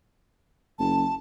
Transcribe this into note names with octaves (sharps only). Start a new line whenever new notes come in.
F#1 A5